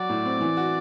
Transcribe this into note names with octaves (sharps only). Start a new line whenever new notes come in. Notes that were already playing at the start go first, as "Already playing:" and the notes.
Already playing: F#3 F#4 D5
A2
C4
E3
F#4